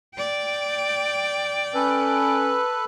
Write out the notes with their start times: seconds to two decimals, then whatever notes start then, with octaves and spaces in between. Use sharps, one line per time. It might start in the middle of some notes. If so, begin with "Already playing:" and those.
0.15 D5 G5
1.74 C#4 A4 B4